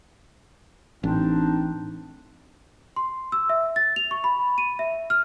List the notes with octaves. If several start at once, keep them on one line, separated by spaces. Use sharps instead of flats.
A1 C4 D4 D#4
C6
E6
E5
A6
F7
C#6
B5
D#7
E5
F6